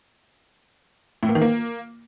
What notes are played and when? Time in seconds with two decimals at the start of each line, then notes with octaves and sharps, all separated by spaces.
1.23 A2
1.29 A#3
1.35 D#3
1.42 A#3